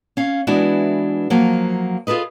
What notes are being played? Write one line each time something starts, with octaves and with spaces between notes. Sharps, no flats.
C#4 F5
E3 G#3 B3 D4 E4 F#4
F3 F#3 A#3
F4 G#4 A4 B4 D#5